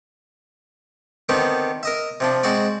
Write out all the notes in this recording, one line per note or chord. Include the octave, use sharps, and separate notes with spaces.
D3 D#3 B3 C4 G4
A#4 D#5 E5
C3 F3 D4
G#3 C4 F#4 D5